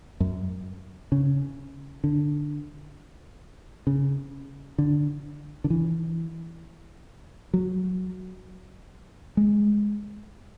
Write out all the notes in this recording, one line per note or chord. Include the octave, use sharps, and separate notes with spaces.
F#2
C#3
D3
C#3
D3
D3
E3
F#3
G#3